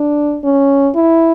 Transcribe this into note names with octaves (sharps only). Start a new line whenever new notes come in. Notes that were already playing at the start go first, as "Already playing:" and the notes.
Already playing: D4
C#4
E4